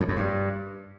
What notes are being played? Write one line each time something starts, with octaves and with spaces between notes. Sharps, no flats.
F2
F#2
G2